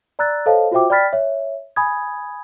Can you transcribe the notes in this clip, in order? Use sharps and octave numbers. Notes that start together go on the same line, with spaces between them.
D5 A#5 E6 F#6 A6
A4 C5 C#5 D#5 F5 A5
F4 F#4 C5 E5 G5 D6
D5 G5 B5 F6 A6 B6
C#5 E5
G#5 B5 D#6 G#6